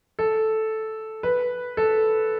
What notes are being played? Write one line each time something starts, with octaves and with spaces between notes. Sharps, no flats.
A4
B4
A4